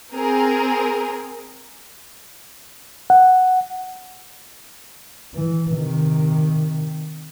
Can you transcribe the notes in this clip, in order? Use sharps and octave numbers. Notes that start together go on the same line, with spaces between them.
C4 G#4 A#4
F#5
E3
C3 D#3